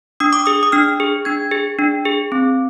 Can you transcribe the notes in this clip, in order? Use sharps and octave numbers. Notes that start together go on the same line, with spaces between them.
D4 D#6
D6
G#4 D#6
D#6
D4 F6
G#4
D4 G#6
G#4
D4
G#4
C4